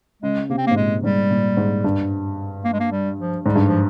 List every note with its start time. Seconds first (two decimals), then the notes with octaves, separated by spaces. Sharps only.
0.22 C#3 G#3
0.49 C3 A#3
0.58 C4
0.67 A#3
0.71 G#2
0.76 A#2 G#3
1.03 G#2 G3
1.30 A#2
1.57 G#2
1.84 G2
2.64 A#3
2.73 G#3
2.80 A#3
2.92 G3
3.19 F3
3.46 G#2 G3
3.56 G2
3.66 F3